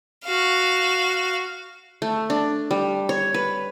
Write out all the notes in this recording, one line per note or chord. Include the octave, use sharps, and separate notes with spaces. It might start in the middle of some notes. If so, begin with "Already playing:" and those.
F#4 F5
A3
D4
G3
C#5
B4